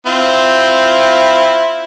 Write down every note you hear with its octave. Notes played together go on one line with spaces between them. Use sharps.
C4 E4 F4